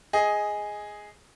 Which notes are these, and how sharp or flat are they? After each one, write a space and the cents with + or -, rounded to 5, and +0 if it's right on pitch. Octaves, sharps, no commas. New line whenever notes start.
G#4 +0 D#5 +10